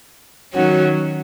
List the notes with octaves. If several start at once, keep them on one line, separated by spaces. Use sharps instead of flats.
D#3 F#3 C#4 F#4